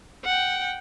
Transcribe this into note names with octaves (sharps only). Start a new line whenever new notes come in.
F#5 G5